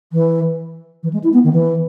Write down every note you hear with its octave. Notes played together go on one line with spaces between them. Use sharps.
E3
E3
G#3
E4
B3
D#3
E3